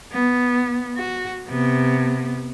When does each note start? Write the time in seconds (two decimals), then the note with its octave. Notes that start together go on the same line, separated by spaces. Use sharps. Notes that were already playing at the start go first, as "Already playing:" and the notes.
0.13 B3
0.97 F#4
1.48 C3 B3